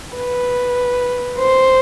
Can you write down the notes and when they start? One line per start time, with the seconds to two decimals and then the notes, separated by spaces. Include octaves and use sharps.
0.17 B4
1.39 C5